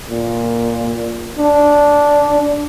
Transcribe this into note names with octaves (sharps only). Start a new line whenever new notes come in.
A#2
D4